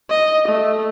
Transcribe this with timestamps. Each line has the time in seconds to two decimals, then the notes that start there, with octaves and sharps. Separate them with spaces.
0.10 D#5
0.48 A3